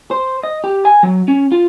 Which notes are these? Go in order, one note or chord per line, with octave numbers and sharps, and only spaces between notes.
C5
D#5
G4
G#5
F#3
C#4
F4